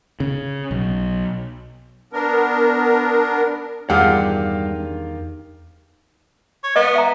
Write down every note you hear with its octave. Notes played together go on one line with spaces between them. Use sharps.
C#3
B1
B3 D4 A#4
E2 G2 D#3 F4 G4 G#4 F5 F#5
C#5
B3 D#5
E5 A#5